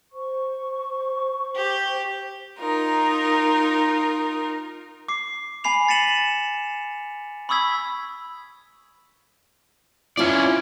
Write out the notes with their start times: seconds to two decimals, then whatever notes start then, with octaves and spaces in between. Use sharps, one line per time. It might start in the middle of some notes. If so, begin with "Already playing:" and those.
0.11 C5 C#6
1.56 G4
2.57 D#4 F4 A#4
5.08 D6 C7
5.64 G#5 B5 C7 F7
5.88 A6 B6 C#7 D#7 E7 F#7
7.49 B5 C#6 D#6 E6 G#6 B6
10.17 C#4 E4 F4 D5